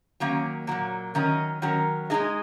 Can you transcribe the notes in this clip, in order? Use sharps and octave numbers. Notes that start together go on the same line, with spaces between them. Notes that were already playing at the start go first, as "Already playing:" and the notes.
D#3 F#3 A#3 C#4
A#2 F#3 A#3
D#3 F#3 C#4 A#4 D#5
D#3 F#3 C#4 A#4
G#3 D#4 G#4 D#5